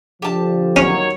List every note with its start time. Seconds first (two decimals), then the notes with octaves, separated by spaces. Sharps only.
0.22 D3 F3 G4 A5
0.76 D#2 F#3 C#4 C#5